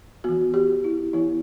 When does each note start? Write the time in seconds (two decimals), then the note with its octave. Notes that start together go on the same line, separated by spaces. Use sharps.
0.24 E3 B3 F#4
0.54 G4
0.84 E4
1.13 E3 B3 E4